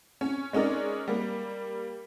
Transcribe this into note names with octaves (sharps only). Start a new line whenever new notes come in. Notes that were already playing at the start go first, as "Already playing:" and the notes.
C#4
G#3 C#4 D#4 A#4 D5
G3 A#3